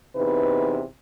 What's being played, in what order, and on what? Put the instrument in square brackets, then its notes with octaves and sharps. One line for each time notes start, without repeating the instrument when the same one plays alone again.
[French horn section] E2 C3 D#4 B4